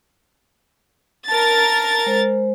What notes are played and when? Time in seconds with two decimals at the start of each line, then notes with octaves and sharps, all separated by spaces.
1.28 A#4 A5 A6
2.06 G#3 C5